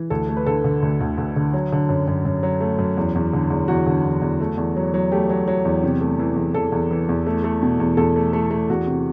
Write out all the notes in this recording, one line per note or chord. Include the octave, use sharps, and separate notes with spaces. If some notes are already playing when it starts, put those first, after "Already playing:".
Already playing: E3
D2 A4
A3
B4
D3 A4
D3
D2
D2
D2
D3
F#3
D3
F#2
F#2
F#2
F#3
A3
F#2
E2
E2
D3
E2
E2 F#4
D3
E2
E2
A3
E2
F#3
F#3
A3 G4
F#3
F#3
E2
C3
A3
E3
E2
E2 A4
E2
E3
E2
A3
A3
B2
E2
E2 A4
A3
A3
A3
E2 F#4
C3